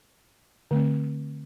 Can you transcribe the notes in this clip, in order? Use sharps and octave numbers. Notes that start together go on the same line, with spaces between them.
D3 A3 C4